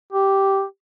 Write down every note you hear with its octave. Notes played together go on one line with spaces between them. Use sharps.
G4